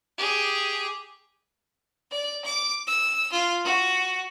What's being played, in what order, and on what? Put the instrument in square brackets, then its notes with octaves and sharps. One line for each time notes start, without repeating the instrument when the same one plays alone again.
[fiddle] G4 G#4
[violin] D5
D6
E6
F4
F#4